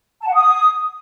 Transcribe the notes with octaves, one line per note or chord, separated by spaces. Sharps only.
A5
F#5
D#6